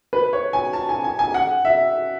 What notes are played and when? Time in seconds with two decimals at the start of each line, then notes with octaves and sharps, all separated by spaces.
0.13 B4
0.33 C#5
0.53 G#5
0.73 A5
0.89 G#5
1.04 G#5
1.19 G#5
1.34 F#5
1.65 E5